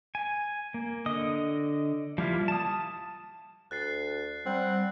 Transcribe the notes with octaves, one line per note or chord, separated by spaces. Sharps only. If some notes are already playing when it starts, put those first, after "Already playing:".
G#5
A#3
D3 D#5 D#6
F3 G3 A#3 E4 F4
A5 D#6
D2 F#6 A6 C7
G3 C4 F#5